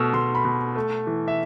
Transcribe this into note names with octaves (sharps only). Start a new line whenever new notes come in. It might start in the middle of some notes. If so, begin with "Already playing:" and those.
Already playing: B2 A3 E6 F6
B2 C6
B5
B2
A3
E3
E5